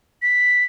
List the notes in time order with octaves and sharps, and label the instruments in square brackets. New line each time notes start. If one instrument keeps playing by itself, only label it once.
[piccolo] B6